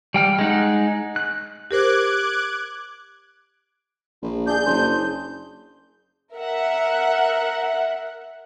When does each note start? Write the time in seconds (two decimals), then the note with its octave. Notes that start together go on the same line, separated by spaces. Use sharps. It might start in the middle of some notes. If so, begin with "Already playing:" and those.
0.14 G3 G5 F6
0.39 G#3 D#4 F#5
1.16 F#6
1.71 G4 A#4 C5 D6 F#6 G#6
4.22 A#1
4.47 D4 G#4 G#5 G6
4.66 F#1 C5
6.35 A#4 E5 F#5